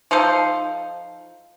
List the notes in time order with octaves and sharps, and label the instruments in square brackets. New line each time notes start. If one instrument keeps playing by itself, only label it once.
[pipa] F3 D#4 A4 C5